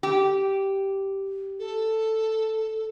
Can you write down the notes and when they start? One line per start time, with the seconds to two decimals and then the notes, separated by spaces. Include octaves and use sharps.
0.03 G4
1.59 A4